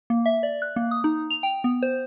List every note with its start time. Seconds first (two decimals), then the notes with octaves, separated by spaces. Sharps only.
0.10 A#3
0.26 E5
0.43 D5
0.62 F#6
0.76 A#3
0.91 D#6
1.04 D#4
1.30 F7
1.43 G5
1.64 B3
1.83 C5